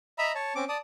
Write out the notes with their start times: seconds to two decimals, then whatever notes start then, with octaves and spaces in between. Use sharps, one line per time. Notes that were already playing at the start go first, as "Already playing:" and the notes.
0.18 D#5 E5 A#5 B5
0.35 C#5 A5
0.55 C4 C#4 D6
0.69 D5 A5 D#6